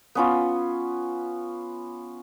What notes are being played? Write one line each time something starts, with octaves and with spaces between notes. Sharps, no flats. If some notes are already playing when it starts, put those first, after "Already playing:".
B3 C#4 F4